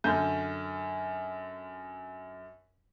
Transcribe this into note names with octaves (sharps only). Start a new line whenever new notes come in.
F#2 D3 G6